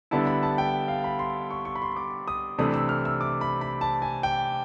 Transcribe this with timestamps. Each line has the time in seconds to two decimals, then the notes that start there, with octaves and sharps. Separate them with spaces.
0.11 D3 G3 B3 E4 A5
0.27 B5
0.43 A5
0.58 G5
0.88 F5
1.04 B5
1.19 C6
1.51 C#6
1.65 C#6
1.76 B5
1.82 C6
1.96 D6
2.28 D#6
2.58 C3 E3 A3 D4 D#6
2.74 E6
2.89 F6
3.05 E6
3.21 D6
3.41 B5
3.61 B5
3.81 A5
4.02 G#5
4.23 G5